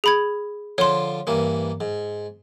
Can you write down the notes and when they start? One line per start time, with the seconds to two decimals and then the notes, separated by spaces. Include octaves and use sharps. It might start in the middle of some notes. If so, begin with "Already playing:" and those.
0.04 G#4 B5 G#6
0.78 D3 F3 F4 C#5 C6
1.27 G2 E3 A#3
1.81 G#2